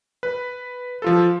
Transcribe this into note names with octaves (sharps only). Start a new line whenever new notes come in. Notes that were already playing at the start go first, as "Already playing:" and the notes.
B4
F3 F4 A4